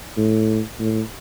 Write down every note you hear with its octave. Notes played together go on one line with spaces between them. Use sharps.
A2
A2